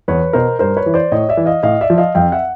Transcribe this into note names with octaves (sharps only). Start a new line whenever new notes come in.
E2 B4 C#5
B2 A#4 C5
G2 A#4 C5
B4 C#5
E3
C5 D5
A2 C#5 D#5
D5 E5
E3
D#5 F5
A2 D#5 F5
D5 E5
F3
D#5 F5
F2 F5 G5
E5 F#5